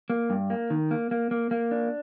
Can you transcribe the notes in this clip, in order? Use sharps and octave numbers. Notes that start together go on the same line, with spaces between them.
A#3
G2
A#3
D#3
A#3
A#3
A#3
A#3
D4